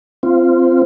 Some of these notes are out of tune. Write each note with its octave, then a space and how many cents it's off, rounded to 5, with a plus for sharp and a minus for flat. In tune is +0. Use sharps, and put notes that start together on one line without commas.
C4 -10 F4 -20